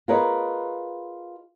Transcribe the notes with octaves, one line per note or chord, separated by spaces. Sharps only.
F4 G#4 A#4 B4 C#5 D#5